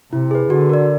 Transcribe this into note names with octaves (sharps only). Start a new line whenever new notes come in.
C3 E4
G#4 B4
D3 F#4
A#4 D5